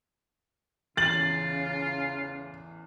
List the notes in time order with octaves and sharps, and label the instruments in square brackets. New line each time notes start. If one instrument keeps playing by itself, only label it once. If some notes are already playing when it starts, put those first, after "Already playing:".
[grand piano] A1 E2 [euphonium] C#3 [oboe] F4 [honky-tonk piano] A6 F#7